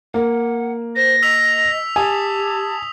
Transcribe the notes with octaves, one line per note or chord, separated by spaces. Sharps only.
A#3 F#5
C5 A#6
D#5 E6 B6 F7
G4 G#5 A5 D#6